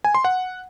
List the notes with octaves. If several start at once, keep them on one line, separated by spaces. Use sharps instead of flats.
G#5
C6
F#5